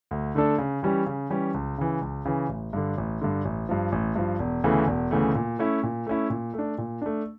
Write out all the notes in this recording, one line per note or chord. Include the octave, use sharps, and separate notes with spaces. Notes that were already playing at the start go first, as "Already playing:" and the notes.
D2
D3 A3 D4 A4
C#3
E3 G3 C#4 G4
C#3
E3 G3 C#4 G4
C#2
C#3 E3
C#2
C#3 E3
A1
G2 D3
A1
G2 D3
A1
G2 F3
A1
G2 F3
E1
D2 C#3 E3 A3
E1
D2 C#3 E3 A3
A#2
A3 C#4 E4
A#2
A3 C#4 E4
A#2
A3 D4
A#2
A3 D4